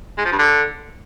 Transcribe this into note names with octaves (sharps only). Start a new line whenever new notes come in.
G#3
F3
G2
D3